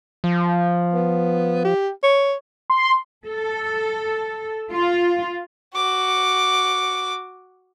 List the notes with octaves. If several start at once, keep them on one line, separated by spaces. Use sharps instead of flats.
F3
B3
G4
C#5
C6
A4
F4
F#4 D6